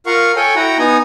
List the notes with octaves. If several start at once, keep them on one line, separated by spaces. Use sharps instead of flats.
F4 A#4 F5 F#5 C#6
A4 C#5 G5 G#5
E4 F#4 F#5 G5 A#5
B3 D#4 G#5 A#5